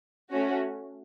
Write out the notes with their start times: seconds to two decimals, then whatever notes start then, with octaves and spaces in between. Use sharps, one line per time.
0.31 A3 C#4 F#4